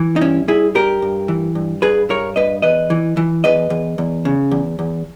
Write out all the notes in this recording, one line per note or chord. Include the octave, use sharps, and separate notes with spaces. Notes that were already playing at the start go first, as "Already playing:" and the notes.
Already playing: E3
D#4
G2 C#4 E4
G2 E4 G#4
G2 G4 A#4
G2
E3
G2
G2 G#4 B4
G2 A#4 C#5
G2 B4 D#5
E2 B4 D#5
E3
E3
E2 B4 D#5
E2
E2
C#3
E2
E2